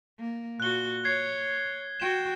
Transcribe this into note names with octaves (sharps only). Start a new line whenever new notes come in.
A#3
A#2 F#4 F#6 G7
C#5 G#6 C7
F#4 G5 E7